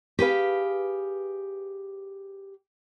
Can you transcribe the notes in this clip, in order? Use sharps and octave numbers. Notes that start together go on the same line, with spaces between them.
G4 G#4 B4 F5